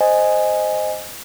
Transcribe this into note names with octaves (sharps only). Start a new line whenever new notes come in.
C5 D#5 G#5